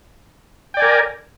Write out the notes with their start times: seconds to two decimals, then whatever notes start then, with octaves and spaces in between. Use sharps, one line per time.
0.74 G5
0.77 D5
0.80 G#5
0.82 A#4